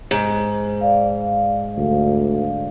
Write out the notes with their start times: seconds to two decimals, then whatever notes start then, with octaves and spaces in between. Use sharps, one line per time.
0.11 G#2
0.81 D5 F5
1.77 D2